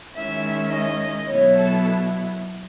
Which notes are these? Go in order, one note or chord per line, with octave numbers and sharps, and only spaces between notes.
D#3 G#3 C#4 E4 E5
D#5
B2 F#3 B3 E4 C#5
A4